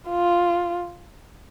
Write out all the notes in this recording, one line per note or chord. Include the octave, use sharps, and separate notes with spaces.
F4